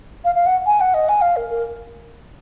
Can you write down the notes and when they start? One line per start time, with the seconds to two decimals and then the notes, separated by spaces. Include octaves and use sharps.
0.24 F5
0.35 F5
0.46 F#5
0.66 G#5
0.81 F#5
0.94 D#5
1.09 G#5
1.21 F5
1.36 A#4
1.50 A#4